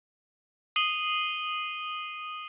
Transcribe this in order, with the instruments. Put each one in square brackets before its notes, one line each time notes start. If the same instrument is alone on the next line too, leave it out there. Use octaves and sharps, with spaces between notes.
[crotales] D#6 C7 D#7 F#7 G7